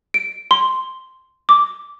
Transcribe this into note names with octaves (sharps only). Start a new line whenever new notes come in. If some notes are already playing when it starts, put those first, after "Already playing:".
D7
C6
D6